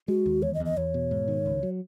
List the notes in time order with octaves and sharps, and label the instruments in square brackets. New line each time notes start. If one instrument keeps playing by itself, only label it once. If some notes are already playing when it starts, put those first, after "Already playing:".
[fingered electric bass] G#3 [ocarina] F#4
[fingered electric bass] D#2
[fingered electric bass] E2 [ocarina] C#5
[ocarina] D#5
[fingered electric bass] E2
[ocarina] D#5
[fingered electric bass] E2 [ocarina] C#5
[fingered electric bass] B2
G#2
D#3
C#2
F#3